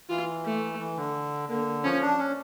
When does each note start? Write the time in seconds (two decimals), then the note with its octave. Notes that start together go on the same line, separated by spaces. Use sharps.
0.09 E3 F4
0.45 A3
0.80 E3
0.97 D3
1.49 D3 A#3
1.84 F3 C#4
2.02 D4
2.19 C#4